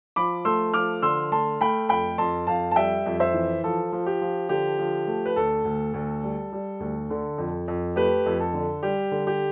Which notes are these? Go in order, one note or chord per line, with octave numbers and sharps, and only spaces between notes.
F3 B5 D6
A3 C6 E6
F3 D6 F6
D3 C6 E6
A3 A5 C6
A3 G5 B5
F2 G5 B5
F2 A5 C6
F2 F5 A5
A5
G3 E5 G5
F2
C5 E5
E3
F3 A4
F3
G4
F3
D3 G4
F3
A3
B4
D2 A4
D2
D2
G3
G3
D2
D3
F2
F2
A3 G4 B4
F2
A4
D3
G3 G4
D3
G4